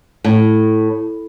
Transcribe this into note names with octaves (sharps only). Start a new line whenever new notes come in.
A2